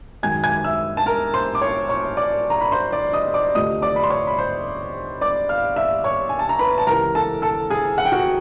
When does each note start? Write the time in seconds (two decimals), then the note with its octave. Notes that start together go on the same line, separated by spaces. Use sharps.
0.23 F#2 D#3 G#3 G#5 G#6
0.43 G#5 G#6
0.64 E5 E6
0.97 A5
1.06 A#4 A#5
1.34 C5 C6
1.55 D6
1.61 C#5 C#6
1.89 C#5 C#6
2.17 D5 D6
2.50 A#5
2.61 B5
2.72 C5 C6
2.93 D5 D6
3.13 D#5 D#6
3.34 D5 D6
3.55 D2 C3 F3 A3 D#5 D#6
3.82 D5 D6
3.96 B5
4.04 C6
4.10 C#5 C#6
4.27 B5
4.38 C5 C6
5.21 D5 D6
5.49 F5 F6
5.76 E5 E6
6.04 C#5 C#6
6.29 G#5
6.39 A5
6.49 A#5
6.59 B4 B5
6.78 A5
6.87 C#2 C3 E3 A#4 A#5
7.15 A4 A5
7.42 A4 A5
7.70 G#4 G#5
7.98 F#5
8.05 G5
8.12 F#4 F#5